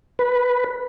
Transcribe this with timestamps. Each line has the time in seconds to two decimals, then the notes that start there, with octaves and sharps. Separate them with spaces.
0.19 B4